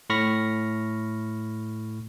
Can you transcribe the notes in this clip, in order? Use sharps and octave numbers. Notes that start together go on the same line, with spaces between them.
A2 B5 C#6 F6 A#6